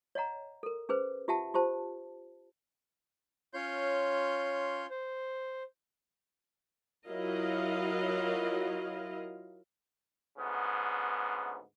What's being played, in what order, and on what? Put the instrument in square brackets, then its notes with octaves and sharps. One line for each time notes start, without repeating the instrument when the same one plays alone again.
[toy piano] C#5 D#5 F#5 A#5
A4 A#4
C#4 G#4 B4 C5
F4 G4 E5 F#5 G5 A5
F4 G4 C5 A5
[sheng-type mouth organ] C#4 F4 C#5 C6 G6
C5
[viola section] F#3 E4 F4 A#4 D#5 F5
[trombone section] D2 G#2 C#3 B3